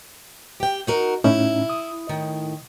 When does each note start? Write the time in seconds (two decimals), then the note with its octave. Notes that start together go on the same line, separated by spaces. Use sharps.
0.60 G4 G5
0.87 D#4 F#4 A#4
1.24 A2 C#4 D#4 E4
1.70 D#6
2.09 A2 D#3